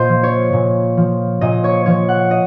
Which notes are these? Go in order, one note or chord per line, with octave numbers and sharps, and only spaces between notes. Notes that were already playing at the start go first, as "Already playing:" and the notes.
Already playing: A#2 C5 D#5
F3
C#5
A#2
F3
A#2 D#5
C#5
F3 C#5
F#5
D#5